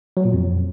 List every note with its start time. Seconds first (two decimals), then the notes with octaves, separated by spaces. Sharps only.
0.17 F#3
0.25 A#2
0.33 F2